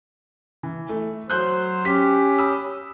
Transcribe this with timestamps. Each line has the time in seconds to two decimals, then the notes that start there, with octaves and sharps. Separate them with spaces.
0.63 E3
0.89 A3
1.30 F#3 C5 F#6 G6
1.85 C#4 G4 B6
2.39 B5 D#6 E6